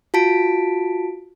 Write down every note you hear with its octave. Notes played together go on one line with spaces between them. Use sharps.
F4 F#4 A5 B6 D7